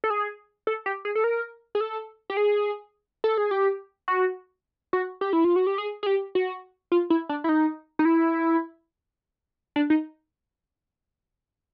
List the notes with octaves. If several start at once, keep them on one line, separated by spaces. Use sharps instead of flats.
A4
G#4
A4
G4
G#4
A4
A#4
G#4
A4
G4
G#4
A4
G#4
G4
F#4
F#4
G4
E4
F4
F#4
G4
G#4
G#4
G4
F#4
F4
E4
D4
E4
D#4
D#4
E4
D4
D#4